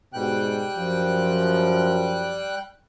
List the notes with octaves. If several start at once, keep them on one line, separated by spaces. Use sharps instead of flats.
G#2 B2 G3 G5 F#6
F#2 F3